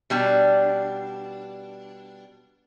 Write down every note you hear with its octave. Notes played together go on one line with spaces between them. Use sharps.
B2 G3 D4